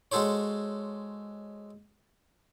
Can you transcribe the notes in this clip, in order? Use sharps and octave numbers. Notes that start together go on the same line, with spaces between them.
G#3 F#4 A4 C5 C#5